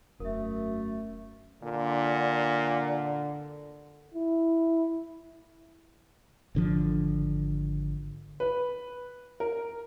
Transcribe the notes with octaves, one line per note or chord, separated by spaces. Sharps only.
E1 F#2 A3 A#4 E5
A#2 D3
E4
G#1 D3 F3
B4
A#4